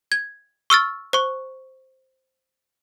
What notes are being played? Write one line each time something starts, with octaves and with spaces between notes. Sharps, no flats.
G#6
C#6 E6 F6 A6
C5 C#6